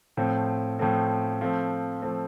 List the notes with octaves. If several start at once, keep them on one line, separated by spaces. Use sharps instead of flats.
A2 F3 A3 C4
A2 F3 A3 C4
F3 A3 C4
F3 A3 C4